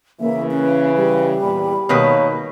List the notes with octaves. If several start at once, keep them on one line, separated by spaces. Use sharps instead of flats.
C#3 E3 A#3 E5
C#4 B4
G3
E2 A#2 B5
B2 D#3 A#3 B4 C#5